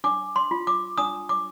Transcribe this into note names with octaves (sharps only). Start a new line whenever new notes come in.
D4 D6
C6
F4
D6
D4 D#6
D6